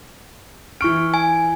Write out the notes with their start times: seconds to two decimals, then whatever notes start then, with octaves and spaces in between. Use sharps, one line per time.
0.81 E3 C#6 F6 D7
1.14 G#5